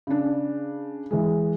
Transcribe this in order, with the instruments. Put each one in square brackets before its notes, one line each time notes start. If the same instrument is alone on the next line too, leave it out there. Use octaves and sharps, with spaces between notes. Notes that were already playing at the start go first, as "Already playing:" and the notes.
[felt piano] C#3 D4
E3 G#3